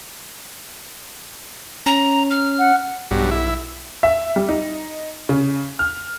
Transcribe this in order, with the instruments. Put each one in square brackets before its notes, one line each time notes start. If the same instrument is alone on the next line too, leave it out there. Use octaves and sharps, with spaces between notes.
[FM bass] C#4 [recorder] A#5
[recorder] F6
[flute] F#5
[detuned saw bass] B1 [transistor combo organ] G2 F#3
[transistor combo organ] E4
[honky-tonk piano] E5
G3
D#4
C#3
F6